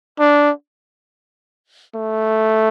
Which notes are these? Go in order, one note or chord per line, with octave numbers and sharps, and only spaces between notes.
D4
A3